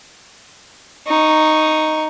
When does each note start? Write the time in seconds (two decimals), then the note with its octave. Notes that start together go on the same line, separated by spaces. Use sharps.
1.07 D#4 C#6